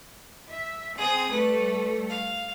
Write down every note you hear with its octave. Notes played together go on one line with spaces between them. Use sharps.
E5
C4 G#4 D#6
G3 A3 A4 B4
F5